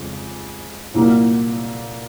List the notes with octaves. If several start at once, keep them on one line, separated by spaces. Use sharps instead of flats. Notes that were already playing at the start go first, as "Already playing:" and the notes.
Already playing: F2 C#3 F3 G#3
C2 A#2 F#3 A#3